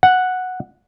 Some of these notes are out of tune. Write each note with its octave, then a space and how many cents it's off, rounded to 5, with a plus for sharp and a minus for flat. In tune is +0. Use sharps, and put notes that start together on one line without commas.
F#5 -5